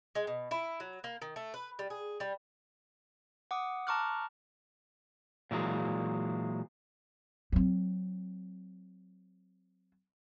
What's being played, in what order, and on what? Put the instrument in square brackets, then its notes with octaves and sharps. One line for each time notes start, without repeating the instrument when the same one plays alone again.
[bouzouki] G#3
B2
E4
F#3
A#3
D#3
A3
B4
G3
G#4
G3
[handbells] F#5 D6 D#6
A5 A#5 C#6 D6 F6 F#6
[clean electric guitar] A#2 E3 F#3 G#3
[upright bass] F#3 C4